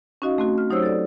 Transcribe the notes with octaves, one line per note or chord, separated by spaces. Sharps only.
C#4 D#4 F#4 D#5 F5
A3 C4 F#4
F6
F#3 D#4 G4 C5 C#5 E6
A4 D5